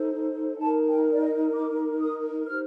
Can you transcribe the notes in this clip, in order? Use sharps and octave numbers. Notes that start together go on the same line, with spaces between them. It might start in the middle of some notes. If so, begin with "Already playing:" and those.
Already playing: D#4 A4 C5
D#4 A#4 A5
G5
D5
D#5
D6
D#6
D#4 G4 C5 F6